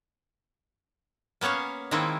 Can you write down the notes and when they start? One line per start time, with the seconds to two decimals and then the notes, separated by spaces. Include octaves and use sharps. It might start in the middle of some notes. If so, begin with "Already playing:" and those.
1.41 A#3 B3 C#4 C#5 F5
1.91 D#3 G#3 A#3 C4 E4